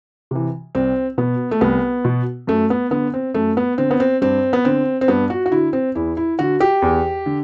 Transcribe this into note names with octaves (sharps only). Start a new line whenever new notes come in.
C3 E3
C2 C4
B2 B3
A3
C2 B3
B2
F#2 A3
B3
D3 B3
C4
F#2 A3
B3
D3 C4
B3
C4
G2 C4
B3
D3 C4
C4
G2 B3
F#4
F#4
D3 E4
C4
E2 E4
E4
D3 F#4
G4
E2
D3